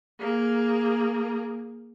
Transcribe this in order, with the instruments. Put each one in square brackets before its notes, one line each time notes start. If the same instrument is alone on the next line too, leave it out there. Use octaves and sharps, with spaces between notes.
[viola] A#3 G#4